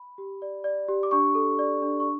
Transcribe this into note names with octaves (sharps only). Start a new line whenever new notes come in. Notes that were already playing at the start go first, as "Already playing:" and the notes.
Already playing: B5
G4
D5
D5
G4
D6
D4 C#6
A4
D5
D4
C#6